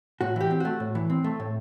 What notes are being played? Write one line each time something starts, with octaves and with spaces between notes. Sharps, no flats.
A2 F#4
E3 G4
C4
A3 F#4
A2
E3
C4
A3
A2